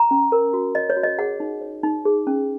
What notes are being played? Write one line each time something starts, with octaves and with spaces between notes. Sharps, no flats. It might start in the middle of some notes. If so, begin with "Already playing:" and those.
Already playing: A#5
C#4
A#4
F#4
C#5 D#5
C#5
F#4
D#5
G#4 F#5
D#4
C#5
D#4
G#4
C#4